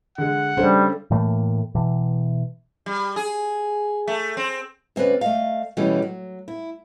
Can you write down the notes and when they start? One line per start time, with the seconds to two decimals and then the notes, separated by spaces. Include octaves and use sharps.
0.18 D3 G#3 F#5
0.57 C#3 G3 D4 A4 C5
1.11 A2 E3 A3 A#3
1.75 B2 E3
2.86 G3
3.16 G#4
4.08 A3
4.37 C4
4.96 D2 C4 C#4 B4 D5
5.21 A3 D#5 F5
5.77 B2 E3 G3 A3 C#4 G4
6.02 F#3
6.48 E4